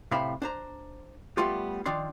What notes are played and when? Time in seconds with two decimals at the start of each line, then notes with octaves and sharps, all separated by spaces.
0.11 A2 C3 C5 E5 F5 B5
0.42 D4 C5 A#5
1.37 G3 A3 B3 F4 G4
1.86 D#3 F3 D4 D5 C6